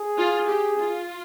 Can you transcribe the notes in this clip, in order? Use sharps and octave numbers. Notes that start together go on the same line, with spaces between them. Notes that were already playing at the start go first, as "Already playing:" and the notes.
Already playing: G#4
F4
G4
F4